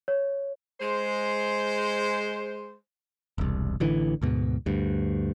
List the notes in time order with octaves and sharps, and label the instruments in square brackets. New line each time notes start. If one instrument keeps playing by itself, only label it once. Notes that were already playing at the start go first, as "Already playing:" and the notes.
[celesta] C#5
[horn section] G#3 C5
[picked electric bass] E1 C2
A1 D3 E3
D2 G#2 B2
D2 G2